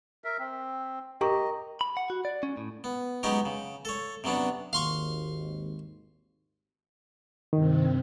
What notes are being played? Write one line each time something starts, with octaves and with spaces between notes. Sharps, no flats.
A#4 E5
C4
G4 A#4 D#5 A#5 C#6
B5
F#5
F#4
D5
C#4
A2
B3
F#3 G#3 B3 C#4 D#4 G4
C#3
A4 C#5
C3 F#3 B3 C#4 D4
G#1 D#2 F5 C6 C#6
G2 C3 D#3 C4